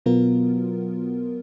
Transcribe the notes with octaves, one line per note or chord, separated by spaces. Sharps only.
B2 F#3 B3 F4 A#4